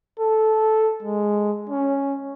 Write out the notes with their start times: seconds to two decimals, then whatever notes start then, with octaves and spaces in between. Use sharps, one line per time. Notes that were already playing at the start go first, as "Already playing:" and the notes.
0.19 A4
1.03 G#3
1.70 C#4